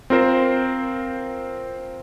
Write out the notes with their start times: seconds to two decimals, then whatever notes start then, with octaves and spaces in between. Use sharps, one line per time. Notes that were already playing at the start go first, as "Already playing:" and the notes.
0.10 C4 F4 A#4 C5